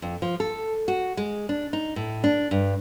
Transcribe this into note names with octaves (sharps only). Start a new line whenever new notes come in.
F2
F3
A4
F#4
G#3
D4
D#4
A2
D4
G2